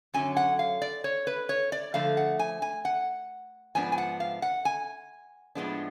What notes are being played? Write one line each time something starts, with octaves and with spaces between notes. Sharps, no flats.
F#2 D3 F#3 C#4 G#5
F#5
F5
D5
C#5
B4
C#5
D5
D3 F3 A3 F5
F#5
G#5
G#5
F#5
G#2 F3 B3 D4 G#5
G#5
F#5
F5
F#5
G#5
A2 F3 G#3 B3 D4